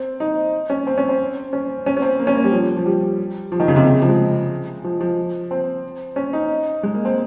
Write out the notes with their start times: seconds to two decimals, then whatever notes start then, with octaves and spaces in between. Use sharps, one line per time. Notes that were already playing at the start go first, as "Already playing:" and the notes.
Already playing: C4
0.20 D#4
0.70 C#4
0.87 C4
0.98 C#4
1.09 C4
1.53 C#4
1.86 C#4
1.97 C#4
2.02 C4
2.19 A#3
2.27 C#4
2.35 A#3
2.44 G3
2.52 F3
2.77 F3
2.86 G3
3.52 F3
3.60 D#3
3.68 C#3
3.76 C3
3.93 C#3
4.02 F3
4.09 G#3
4.84 F3
5.01 F3
5.51 C4
6.16 C#4
6.33 D#4
6.83 G#3
6.94 A#3
7.05 C4